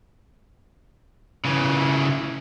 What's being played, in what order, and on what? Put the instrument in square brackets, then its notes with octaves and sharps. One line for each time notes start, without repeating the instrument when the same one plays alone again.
[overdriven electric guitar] C#3 E3